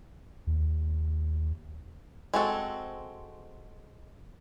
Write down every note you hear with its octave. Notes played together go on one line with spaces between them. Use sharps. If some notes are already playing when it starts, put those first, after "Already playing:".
D#2
G#3 C4 F#4 A4